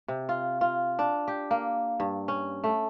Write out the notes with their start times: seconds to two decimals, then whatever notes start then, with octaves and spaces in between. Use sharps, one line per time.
0.08 C3
0.29 F4
0.61 F4
0.99 D4
1.28 G4
1.51 A#3
2.00 G2
2.28 C#4
2.64 A3